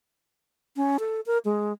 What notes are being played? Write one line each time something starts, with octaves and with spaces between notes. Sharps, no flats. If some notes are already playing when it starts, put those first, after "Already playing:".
C#4
A4
A#4
G#3